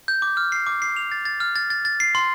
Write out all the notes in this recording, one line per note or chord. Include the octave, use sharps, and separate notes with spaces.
G6
D6
F6
C7
D6
C7
F7
A6
A6
F6
A6
A6
A6
C7
C6